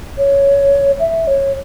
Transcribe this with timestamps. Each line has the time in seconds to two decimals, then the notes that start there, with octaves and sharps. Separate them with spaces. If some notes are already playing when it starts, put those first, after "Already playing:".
0.18 C#5
1.00 E5
1.27 C#5